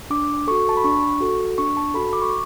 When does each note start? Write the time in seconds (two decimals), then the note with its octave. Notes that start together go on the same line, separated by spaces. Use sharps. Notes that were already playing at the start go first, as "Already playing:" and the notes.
0.10 D4 D6
0.47 F#4 A4 C#6
0.69 A5
0.77 B5
0.84 D4 C#6
1.20 F#4 A4
1.58 D4 C#6
1.77 A5
1.94 F#4 A4 B5
2.13 D6
2.22 C#6